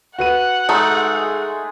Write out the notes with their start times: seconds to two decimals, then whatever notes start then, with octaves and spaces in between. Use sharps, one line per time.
0.19 F#4 B4 F#5 D#7
0.69 G#3 A3 D#4 G#4